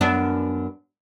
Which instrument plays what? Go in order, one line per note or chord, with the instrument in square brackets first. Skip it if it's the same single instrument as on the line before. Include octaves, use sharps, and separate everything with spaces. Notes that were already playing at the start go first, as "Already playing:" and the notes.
[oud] F#2 B3 D4